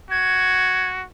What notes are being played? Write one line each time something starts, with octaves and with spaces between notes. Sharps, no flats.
F#4 G#6